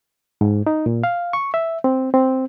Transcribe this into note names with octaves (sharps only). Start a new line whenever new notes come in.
G#2
D#4
A#2
F5
C#6
E5
C4
C4